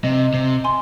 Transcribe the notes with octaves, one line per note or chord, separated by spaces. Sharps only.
C3 D#5
C3
G#5 C6